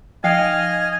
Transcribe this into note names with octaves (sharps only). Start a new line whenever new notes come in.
F3 D#4 D#5 F5 G5 G#5 F6